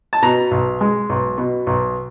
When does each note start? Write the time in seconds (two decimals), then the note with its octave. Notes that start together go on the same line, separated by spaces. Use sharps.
0.13 A5
0.22 B2 A#5
0.51 B1
0.81 G#3
1.09 B1
1.38 B2
1.67 B1